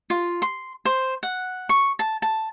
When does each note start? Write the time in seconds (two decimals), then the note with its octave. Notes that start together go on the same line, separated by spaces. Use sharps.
0.10 F4
0.42 C6
0.85 C5
1.23 F#5
1.69 C#6
1.99 A5
2.22 A5